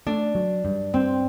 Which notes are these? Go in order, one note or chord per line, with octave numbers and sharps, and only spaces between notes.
A3 D4
F#3
G2
G2 C4